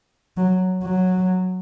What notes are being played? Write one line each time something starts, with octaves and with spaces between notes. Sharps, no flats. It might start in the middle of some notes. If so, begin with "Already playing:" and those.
F#3
F#3